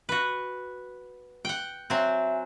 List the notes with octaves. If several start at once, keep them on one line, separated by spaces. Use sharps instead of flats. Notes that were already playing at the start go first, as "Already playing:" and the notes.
F#4 B4
F#5 G5
F#3 C4 E5 G#5